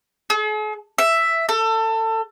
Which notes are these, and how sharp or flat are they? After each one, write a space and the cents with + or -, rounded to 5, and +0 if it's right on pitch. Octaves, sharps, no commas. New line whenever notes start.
G#4 +45
E5 +5
A4 +25